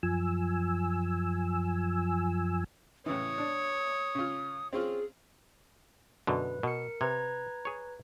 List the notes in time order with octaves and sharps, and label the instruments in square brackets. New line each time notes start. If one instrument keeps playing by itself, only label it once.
[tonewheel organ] F#2 F3 G#5 E6
[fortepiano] A2 C#3 E3 [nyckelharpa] C#5 [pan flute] D#6
[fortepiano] D4 D5
C#3 F4
[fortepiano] C4 C#4 F4 [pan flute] G#4
[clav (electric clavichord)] F#2 B2 D3 [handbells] B4
[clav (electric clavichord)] B2 [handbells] A#4 C#7
[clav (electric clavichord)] C3 [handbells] B4 A#5 G#6
[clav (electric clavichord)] G#4 C#5